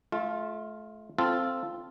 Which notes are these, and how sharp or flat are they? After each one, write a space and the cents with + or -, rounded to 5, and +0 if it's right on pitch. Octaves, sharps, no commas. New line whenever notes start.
A3 -30 F4 +0
C4 +0 F4 -10 A4 +0